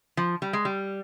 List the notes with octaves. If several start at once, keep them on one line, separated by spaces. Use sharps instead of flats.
F3
G3
G#3
G3